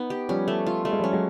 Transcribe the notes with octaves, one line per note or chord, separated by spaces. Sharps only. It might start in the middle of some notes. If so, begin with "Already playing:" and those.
Already playing: B3 D#4
G4
F3 G3 C#4
A3
F4
G3 A3
G#3
F3 G3 C#4
F#3 G#3